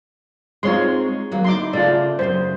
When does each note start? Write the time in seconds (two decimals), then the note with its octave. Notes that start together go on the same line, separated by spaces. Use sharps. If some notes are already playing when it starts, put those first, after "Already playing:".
0.63 G#3 C4 D#4 F4 C#5 C6
1.32 D#2 F#3 A#3
1.44 D2 D#4 E4 C6 D6
1.73 C#3 A3 F4 D5
2.19 F#2 A#2 C#3 C5